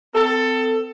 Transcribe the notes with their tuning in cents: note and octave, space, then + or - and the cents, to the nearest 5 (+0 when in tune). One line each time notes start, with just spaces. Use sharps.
C4 -35 A4 +15